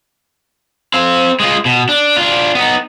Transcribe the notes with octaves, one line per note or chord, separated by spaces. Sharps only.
C4 F5
G#3 F4
B2
D4
D4 F4
B3 D#4